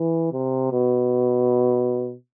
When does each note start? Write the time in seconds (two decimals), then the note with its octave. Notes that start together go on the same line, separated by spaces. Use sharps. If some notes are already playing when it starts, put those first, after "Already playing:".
Already playing: E3
0.33 C3
0.72 B2